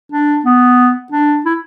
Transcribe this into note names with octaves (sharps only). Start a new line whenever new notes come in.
D4
B3
D4
E4